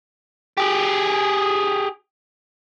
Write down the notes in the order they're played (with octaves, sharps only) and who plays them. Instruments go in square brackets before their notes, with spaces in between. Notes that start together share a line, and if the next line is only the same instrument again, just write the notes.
[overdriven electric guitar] G4 G#4